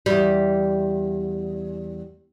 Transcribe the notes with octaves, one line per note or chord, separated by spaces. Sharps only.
E2 G3